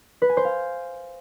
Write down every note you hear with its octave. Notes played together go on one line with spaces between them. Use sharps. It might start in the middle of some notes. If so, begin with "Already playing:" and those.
B4
G#5
C5
F5